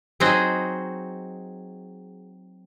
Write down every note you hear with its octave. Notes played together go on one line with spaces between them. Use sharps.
F#3 C4 D#4 F#4 G#4 D#5